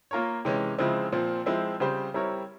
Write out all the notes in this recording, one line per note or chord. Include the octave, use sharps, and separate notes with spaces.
A#3 F4 A#4 C#5
C3 E3 G#3 C#4
C#3 F3 G#3 C4 E4
A#2 F3 C4
F3 G#3 C4 E4
C#3 G3 C4 G4 C5
G3 C4 E4 A#4 C#5